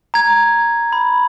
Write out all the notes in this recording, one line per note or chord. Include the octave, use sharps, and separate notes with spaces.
A#5 G#6
B5